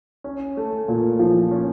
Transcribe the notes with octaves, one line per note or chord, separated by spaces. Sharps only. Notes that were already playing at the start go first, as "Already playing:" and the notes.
C#4
A3
A#2
F3
C#4